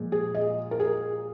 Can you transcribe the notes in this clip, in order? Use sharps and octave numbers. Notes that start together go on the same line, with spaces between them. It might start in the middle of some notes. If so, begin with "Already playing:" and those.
Already playing: A#2 F3 G#3
G#4
D#5
A#4
G#4